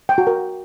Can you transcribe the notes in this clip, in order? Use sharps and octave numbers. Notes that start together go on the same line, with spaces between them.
G5
F#4
A#4